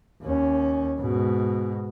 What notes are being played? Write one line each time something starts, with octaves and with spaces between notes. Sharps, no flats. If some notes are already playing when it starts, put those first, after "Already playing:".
D#2 C#4
G#2 B2